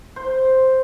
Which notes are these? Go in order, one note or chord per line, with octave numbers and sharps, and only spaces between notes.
C5